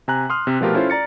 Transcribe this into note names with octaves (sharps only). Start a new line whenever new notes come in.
C3 G#5 A#5 F#6
C6 D#6 F6
C3 C4
B2 F3 A3 F4 G4 A#4
C#4 E4 F4 A4 C5
D5 A#5 A6 C#7